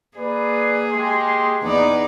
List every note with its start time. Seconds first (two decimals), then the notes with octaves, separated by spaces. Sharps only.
0.17 A#3 G#4 B4 D5
0.92 G#3 G4 C6
1.63 E2 B3 D#4 D5